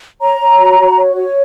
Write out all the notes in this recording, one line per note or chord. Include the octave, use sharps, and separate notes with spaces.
C#5 A#5
C#5
F#4
F#4
C#5
C#5